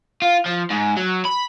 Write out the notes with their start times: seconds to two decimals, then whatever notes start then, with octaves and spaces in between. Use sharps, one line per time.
0.22 F4
0.46 F3
0.71 G#2
0.97 F#3
1.25 B5